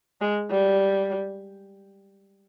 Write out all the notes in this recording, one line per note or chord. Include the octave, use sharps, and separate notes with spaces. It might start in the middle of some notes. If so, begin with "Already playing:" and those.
G#3
G3